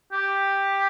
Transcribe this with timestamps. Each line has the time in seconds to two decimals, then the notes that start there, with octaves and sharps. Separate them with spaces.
0.13 G4